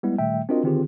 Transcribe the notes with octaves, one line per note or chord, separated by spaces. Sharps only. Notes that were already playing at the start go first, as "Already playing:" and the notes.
G3 G#3 B3 E4
A#2 D#3 G3 A3 E5 G5
C4 D4 F4 F#4 A#4 D#5
D3 D#3 C4 F4 G4 G#4